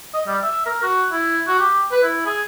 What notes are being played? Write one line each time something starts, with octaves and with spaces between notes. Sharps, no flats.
D#5
G3
E5
A#4
F#4
E4
F#4
G4
B4
E4
G#4